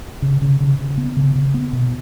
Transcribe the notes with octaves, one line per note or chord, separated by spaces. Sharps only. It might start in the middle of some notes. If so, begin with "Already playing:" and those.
C#3
C#3
C#3
C#3
B3
C#3
C#3
B3
B2